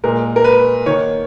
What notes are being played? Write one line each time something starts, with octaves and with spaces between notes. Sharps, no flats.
A#2 G#3 A#4
A#4
B4
D#3 A#3 C#5